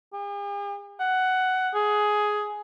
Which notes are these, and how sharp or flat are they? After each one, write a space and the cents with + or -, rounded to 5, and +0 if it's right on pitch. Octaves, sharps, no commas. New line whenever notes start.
G#4 -45
F#5 +10
G#4 +10